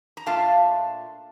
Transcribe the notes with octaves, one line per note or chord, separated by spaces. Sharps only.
A#5
A#2 A3 D4 F4 F5 A5